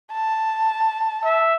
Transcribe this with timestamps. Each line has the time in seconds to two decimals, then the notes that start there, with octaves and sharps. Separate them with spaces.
0.11 A5
1.25 E5